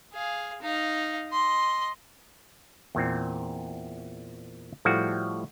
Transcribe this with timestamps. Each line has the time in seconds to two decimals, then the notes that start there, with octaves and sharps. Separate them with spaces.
0.13 G#4 F5
0.62 D#4 F5
1.29 D#5 C6
2.95 E2 A#2 C4
4.85 A2 F3 G3 A3 F#4